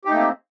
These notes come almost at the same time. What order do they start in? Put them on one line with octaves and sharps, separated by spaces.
G4 D#4 A3 A#3 C4